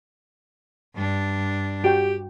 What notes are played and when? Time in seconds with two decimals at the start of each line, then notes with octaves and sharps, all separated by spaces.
0.95 G2 D4
1.84 F#4 G4 G5